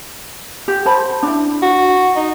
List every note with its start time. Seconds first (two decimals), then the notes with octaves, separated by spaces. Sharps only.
0.68 G4
0.86 C5 A5 B5
1.23 D4 E4
1.62 F#4
2.16 D#4